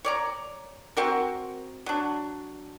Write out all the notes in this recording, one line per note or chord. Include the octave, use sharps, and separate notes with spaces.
C#5 D5 A#5
C4 F#4 A#4
F#3 D4